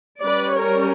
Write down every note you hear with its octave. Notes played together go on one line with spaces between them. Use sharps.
G3 C#4 B4 D5
A#4 C#5